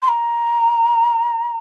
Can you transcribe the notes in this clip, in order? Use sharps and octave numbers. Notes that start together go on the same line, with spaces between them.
C6
A#5